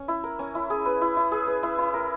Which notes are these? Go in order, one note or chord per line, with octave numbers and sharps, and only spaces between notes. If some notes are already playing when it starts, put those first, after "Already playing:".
Already playing: C#4
E4
A#4
C#4
E4
G#4
B4
E4
E4
G#4
B4
E4
E4
A#4